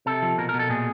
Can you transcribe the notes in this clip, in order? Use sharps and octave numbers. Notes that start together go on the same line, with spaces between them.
C3 A4
F3
B2 A#4
A#4
B2
A4
A#2 G#4